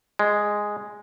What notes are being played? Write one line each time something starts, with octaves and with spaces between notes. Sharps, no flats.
G#3